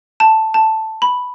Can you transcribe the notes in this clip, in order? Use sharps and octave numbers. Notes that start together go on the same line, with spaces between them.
A5
A5
B5